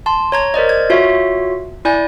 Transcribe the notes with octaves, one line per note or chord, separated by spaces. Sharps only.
A5 C6
C#5 A#5 G#6
A#4 C5 D5 D#5
G#6
F4 F#4 C#5 E5
E4 D5 G#5 G6